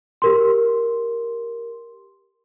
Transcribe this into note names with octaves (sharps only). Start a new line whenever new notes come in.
G4 A#4 C6